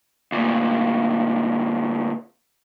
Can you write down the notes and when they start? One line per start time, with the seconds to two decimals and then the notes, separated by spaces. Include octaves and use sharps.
0.32 D2 A#2